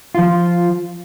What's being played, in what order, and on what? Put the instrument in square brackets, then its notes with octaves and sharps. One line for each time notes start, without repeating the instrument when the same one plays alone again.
[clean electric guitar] F3 F4